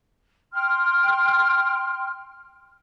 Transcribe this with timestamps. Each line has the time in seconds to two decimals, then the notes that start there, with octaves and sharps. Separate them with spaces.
0.53 G5 C6 F6